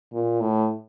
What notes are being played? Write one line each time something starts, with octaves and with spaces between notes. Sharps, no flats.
A#2
A2